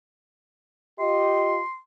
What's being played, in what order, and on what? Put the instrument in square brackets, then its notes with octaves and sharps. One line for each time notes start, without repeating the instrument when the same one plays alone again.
[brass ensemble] F4 G4 D#5 [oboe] C6